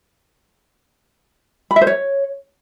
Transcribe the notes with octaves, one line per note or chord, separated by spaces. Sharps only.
B5
E5
C5
C#5